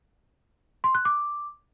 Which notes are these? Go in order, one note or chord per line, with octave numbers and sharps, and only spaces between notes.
C6
F#6
D6